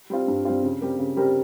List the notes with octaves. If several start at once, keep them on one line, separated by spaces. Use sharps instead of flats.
G3 C4 F4
G2
G3 C4 F4
C#3
G3 C4 G4 A#4
C#3
G3 C4 G4 A#4